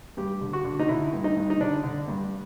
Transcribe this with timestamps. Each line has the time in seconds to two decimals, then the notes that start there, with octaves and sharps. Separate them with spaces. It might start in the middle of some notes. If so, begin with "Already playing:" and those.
0.17 G2 G4
0.41 D3
0.53 F#4
0.65 D3
0.79 D#4
0.89 D3 E4
1.13 G2
1.24 D#4
1.36 G2
1.50 D#4
1.60 D3 D4
1.84 D3
2.08 G2